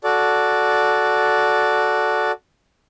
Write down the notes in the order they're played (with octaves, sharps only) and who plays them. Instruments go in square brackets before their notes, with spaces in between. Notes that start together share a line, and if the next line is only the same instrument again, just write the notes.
[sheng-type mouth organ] F#4 A4 D5